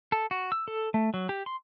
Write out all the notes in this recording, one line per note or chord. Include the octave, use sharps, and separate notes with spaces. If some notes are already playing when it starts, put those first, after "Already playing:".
A4
F#4
E6
A4
A3
F#3
G4
C6